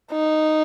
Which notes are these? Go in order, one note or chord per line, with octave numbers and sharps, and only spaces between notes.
D#4